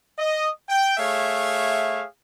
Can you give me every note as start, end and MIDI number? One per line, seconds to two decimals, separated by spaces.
0.17 0.48 75
0.68 0.96 79
0.97 2.03 57
0.97 2.03 68
0.97 2.03 73
0.97 2.03 76
0.97 2.03 77